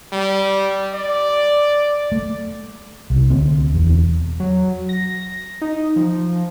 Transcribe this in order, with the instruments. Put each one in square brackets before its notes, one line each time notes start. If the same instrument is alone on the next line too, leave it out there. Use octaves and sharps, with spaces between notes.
[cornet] G3
D5
[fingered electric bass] A3
C2
D2 C4
E1 E2
[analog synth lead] F#3
A#6
D#4
F3